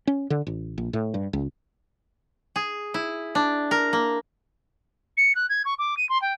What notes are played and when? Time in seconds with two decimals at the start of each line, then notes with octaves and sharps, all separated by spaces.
0.07 C#4
0.30 D3
0.47 A1
0.78 A#1
0.93 A2
1.14 G2
1.33 C#2
2.56 G#4
2.94 E4
3.35 D4
3.71 A#4
3.93 A#3
5.17 C#7
5.35 F#6
5.49 G#6
5.65 C#6
5.79 D6
5.97 D#7
6.09 C6
6.22 G5